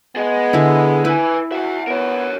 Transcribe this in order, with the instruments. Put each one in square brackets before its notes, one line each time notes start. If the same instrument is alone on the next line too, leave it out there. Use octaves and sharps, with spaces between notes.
[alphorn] B3 [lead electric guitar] G#4 D#5
[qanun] D3 E4
[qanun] E4 [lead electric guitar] B4 G#5
[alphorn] F#4 [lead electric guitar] E5 F#5
[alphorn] B3 [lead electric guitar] A#4 C#5